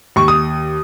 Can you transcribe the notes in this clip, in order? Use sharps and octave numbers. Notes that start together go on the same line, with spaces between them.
D#2 C#6
D#6